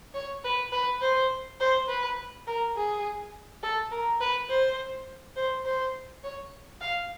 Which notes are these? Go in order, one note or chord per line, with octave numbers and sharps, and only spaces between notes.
C#5
B4
B4
C5
C5
B4
A#4
G#4
A4
A#4
B4
C5
C5
C5
C#5
F5